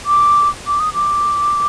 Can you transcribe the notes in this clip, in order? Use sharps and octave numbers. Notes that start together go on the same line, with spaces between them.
D6
D6
D#6
D6